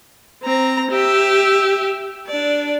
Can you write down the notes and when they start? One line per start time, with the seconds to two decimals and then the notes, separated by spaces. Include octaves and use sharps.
0.43 C4 A#5
0.91 G4 E5
2.28 D4 D5